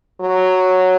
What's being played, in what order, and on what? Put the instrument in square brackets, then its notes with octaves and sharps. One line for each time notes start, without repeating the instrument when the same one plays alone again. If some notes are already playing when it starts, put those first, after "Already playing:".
[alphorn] F#3